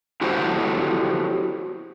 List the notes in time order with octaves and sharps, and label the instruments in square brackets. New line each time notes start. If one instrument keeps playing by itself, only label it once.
[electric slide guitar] E4 F#4 G4 A4 C5 C#5